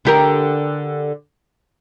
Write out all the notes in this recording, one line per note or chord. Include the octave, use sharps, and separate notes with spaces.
D3 G4 A#4